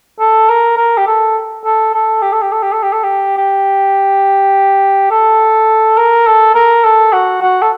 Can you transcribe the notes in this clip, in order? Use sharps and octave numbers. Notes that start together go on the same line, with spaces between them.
A4
A#4
A#4
G4
A4
A4
A4
G4
A4
G4
A4
G4
A4
G4
A4
G4
G4
A4
A#4
A4
A#4
A4
F#4
F#4
A4